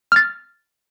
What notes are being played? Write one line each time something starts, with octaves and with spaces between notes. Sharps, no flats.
F6 A6